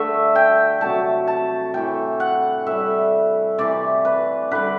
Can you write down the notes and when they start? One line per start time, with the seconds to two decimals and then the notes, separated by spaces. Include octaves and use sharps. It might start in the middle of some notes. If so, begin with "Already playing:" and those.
Already playing: D3 A3 E5
0.35 G5
0.81 C3 F#3 A3 A5
1.27 A5
1.74 A2 E3 A3 G5
2.20 F#5
2.66 A2 G3 E5
3.58 C3 E3 A3 D5
4.05 B4
4.51 D3 G3 B4